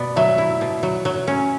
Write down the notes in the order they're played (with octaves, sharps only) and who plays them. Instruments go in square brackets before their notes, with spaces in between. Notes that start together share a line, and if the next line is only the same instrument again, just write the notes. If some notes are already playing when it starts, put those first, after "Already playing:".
Already playing: [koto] B2 B3 [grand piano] D5
[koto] F#3 [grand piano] E5
[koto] E4
B2
F#3
F#3
C#4